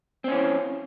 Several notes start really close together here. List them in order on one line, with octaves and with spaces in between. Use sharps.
C4 C#4 E3